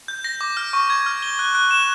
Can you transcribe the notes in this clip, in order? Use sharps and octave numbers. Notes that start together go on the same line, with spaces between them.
G6
A#6
D6
F6
C#6
G#6
F6
G7
F#6
F#6
E7